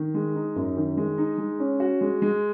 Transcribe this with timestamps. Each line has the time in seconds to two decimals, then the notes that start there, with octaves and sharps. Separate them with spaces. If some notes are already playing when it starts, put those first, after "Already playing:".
Already playing: D#3
0.14 G#3
0.35 D#4
0.56 F#2
0.77 D#3
0.97 G#3
1.18 D#4
1.38 G#3
1.59 C#4
1.80 F#4
2.01 G#3
2.22 G#3